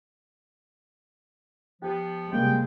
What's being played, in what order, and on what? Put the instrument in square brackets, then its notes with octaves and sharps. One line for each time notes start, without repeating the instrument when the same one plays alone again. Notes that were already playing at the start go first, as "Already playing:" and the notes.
[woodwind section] F3 B3 [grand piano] G4
[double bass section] C3 G3 G#3 [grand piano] A#3 [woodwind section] G5